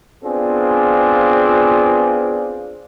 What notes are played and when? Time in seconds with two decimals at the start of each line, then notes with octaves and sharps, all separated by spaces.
0.24 B3 C4 D4 F4 G#4